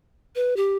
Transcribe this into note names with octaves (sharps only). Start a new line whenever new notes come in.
B4
G4